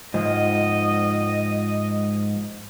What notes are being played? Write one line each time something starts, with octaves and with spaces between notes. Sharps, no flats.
G#2 F3 D#5